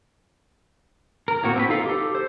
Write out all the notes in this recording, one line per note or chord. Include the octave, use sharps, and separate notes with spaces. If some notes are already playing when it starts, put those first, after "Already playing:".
A#4
A2 A#3 C4 F#4
C4 G#4 B4
D#4 F4 A4 F5
G4 A4
C5